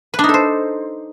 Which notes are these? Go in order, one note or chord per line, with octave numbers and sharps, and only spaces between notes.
B4
D4
D#4
A4
C5